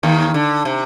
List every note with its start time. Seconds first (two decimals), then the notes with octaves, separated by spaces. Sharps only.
0.03 D#2 D#3
0.34 D3
0.65 C3